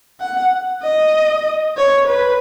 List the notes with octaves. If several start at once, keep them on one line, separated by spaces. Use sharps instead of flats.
F#5
D#5
C#5
B4